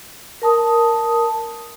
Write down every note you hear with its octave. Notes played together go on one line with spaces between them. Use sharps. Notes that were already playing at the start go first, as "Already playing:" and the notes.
A#4 A5 D#6